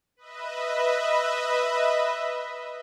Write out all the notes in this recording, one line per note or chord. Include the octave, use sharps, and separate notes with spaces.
B4 D#5 E5